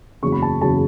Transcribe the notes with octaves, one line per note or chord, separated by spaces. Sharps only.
F#1 E2 C#3 F#3 C#6
B5
A5
F#1 E2 C#3 F#3 A5